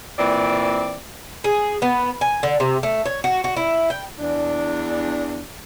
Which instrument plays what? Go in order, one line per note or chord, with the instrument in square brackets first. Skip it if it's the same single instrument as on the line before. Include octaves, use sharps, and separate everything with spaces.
[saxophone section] A#2 E3 C4 D5
[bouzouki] G#4
B3
G#5
D3
C3
A3
C#5
F#4
F#4
E4
G5
[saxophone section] E2 D4